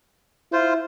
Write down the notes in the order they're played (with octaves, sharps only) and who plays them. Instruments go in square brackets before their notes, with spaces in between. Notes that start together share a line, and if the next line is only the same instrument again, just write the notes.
[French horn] E4 [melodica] F4 C5